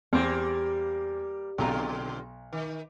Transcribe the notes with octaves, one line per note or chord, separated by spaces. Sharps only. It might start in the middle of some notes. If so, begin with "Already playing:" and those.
E2 G3 A#3 C4
B1 B2 D3 F4 A#5
D#3